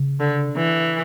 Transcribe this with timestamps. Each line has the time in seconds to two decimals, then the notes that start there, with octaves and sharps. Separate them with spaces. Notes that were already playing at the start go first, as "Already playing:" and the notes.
Already playing: C#3
0.20 D3
0.56 E3